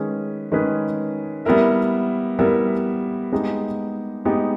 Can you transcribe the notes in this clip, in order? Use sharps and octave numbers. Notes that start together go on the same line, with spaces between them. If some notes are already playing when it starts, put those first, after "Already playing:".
Already playing: D#3 G#3 C#4 G#4 B4
D#3 G#3 C#4 G#4 B4
G3 B3 E4 A#4 E5
G3 B3 E4 A#4 E5
G#3 B3 D#4 G4
G#3 B3 D#4 G4